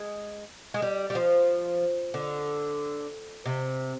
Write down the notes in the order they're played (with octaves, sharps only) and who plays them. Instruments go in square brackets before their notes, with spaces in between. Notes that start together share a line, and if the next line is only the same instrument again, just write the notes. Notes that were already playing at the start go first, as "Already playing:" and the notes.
Already playing: [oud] G#3
G#3
G3
G3
F3
D3
C3